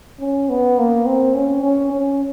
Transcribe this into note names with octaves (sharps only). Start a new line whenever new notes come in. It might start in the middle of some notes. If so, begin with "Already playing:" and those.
C#4
B3
A#3
C4
C#4
C#4
C#4